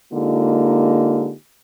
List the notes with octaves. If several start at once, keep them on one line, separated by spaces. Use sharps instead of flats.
D3 G#3 A#3 D#4 F4 G4